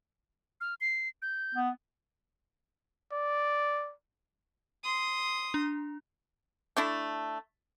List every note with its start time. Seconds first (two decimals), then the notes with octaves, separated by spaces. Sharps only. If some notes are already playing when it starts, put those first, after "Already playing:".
0.61 F6
0.81 C7
1.22 G6
1.55 B3
3.12 D5
4.84 C6 D#6
5.54 D4
6.77 A3 D4 E4